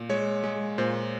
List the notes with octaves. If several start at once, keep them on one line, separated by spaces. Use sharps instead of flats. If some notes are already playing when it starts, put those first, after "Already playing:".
Already playing: A#2
G#3 C#5
G#3
A#2 C5